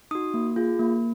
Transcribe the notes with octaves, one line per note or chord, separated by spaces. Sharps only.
D#4 F#4 D#6
A#3
F4 G#4
A#3